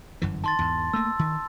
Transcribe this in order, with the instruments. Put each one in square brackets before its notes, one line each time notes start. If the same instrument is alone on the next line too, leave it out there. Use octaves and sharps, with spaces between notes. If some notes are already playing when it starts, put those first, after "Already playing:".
[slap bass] G1 F#2 E3
[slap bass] D#3 [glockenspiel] A5 C6 A6
[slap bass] E2 G#2
[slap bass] A3 A#3 [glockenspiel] E6
[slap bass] D#3